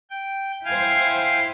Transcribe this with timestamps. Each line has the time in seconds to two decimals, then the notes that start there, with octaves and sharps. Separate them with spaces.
0.10 G5
0.65 E4 C5 F5 G5 G#5